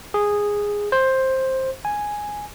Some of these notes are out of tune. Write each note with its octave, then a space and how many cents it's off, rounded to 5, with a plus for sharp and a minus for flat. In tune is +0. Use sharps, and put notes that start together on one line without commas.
G#4 -10
C5 +10
G#5 +0